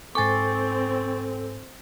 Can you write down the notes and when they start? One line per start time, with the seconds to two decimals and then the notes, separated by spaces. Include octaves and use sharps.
0.15 G#2 C4 A4 C5 G#5 C#6 D6 A6